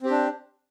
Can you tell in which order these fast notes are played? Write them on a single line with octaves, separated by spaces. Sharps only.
C4 G4 D4